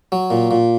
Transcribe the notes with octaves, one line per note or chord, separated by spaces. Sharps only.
F#3
A#2
A#2